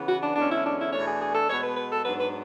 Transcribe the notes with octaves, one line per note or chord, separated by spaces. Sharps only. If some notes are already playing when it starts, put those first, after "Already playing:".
Already playing: C#3 E3 B3
F#4
D4
E2 D3 G#3 C#4 D4
E4
D4
E4
E2 B2 A3 D4 C#5
G#4
G#4
A4
B2 G#3 B3 C#5
B4
B4
A4
G#2 F#3 B3 D4 B4
B4